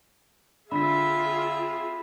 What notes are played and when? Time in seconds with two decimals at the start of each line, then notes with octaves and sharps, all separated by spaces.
0.72 D3 C4 F4 G#4 E5 B5 B6